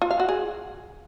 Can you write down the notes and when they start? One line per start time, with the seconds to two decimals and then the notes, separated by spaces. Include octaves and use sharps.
0.02 F4
0.11 F5
0.20 F#4
0.29 G#4